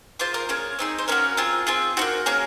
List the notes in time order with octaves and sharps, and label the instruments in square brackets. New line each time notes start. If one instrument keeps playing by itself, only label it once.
[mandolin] A#3 F4 G#4 C5 C6
A#4 A#5
A#3 C#4 G#4 C#5
C4 D#4 G#4
C5
A#3 C#4 F#4 A#4
C4 F4 G#4
C4 F4 G#4
D#4 F#4 C5
A#3
A#3 C#4 G#4 A#4